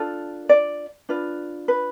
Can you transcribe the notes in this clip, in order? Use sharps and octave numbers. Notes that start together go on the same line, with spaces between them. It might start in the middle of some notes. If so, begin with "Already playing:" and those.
Already playing: D4 F4 A4
D5
D4 F4 B4
B4